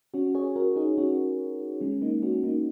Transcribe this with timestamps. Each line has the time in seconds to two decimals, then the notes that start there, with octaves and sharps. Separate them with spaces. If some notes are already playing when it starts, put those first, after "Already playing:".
0.14 C#4 F#4
0.35 G#4 C#5
0.56 F#4 A#4
0.76 D#4 G#4
0.98 C#4 F#4
1.81 G#3 C#4
2.02 A#3 D#4
2.23 C#4 F#4
2.44 A#3 D#4